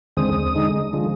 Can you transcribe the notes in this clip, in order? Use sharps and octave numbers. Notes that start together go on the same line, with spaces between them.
D#2 D3 G#3 C4 D#6
D3 G#3 D#4
D3 F3 G#3